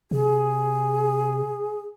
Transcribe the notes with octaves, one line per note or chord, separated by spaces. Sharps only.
C3 G#4